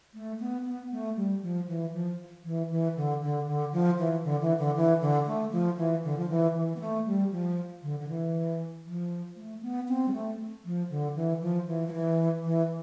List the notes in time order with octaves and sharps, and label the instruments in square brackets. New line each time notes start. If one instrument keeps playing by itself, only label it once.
[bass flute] A3
B3
B3
A3
G3
F3
E3
F3
E3
E3
D3
D3
D3
F3
E3
D3
E3
D3
E3
D3
A3
F3
E3
D3
F3
E3
E3
B3
A3
G3
F3
D3
D3
E3
F3
A3
B3
C4
G3
A3
F3
D3
E3
F3
E3
F3
E3
E3